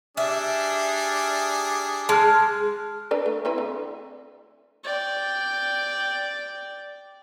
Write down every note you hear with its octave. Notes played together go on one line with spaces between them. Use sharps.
G3 D4 G#4 E5
G#3 A5 F6
D4 B4 D5
A3
C4 E4 B4
D3
D5 G5